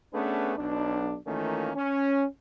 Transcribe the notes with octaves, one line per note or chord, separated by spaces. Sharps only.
A3 B3 C#4 D4 G#4 B4
B1 D4
D#3 E3 A3 A#3 C#4 F4
C#4